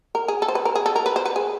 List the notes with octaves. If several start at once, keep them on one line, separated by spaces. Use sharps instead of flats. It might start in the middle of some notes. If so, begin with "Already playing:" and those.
A#4
G#4
A4
C5
B4
A#4
G#4
A4
A#4
B4
C5
B4
G#4